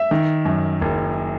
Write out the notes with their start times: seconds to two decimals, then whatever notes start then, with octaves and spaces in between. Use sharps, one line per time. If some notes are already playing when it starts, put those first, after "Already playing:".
Already playing: E5
0.11 D#3
0.45 F#2
0.81 F#1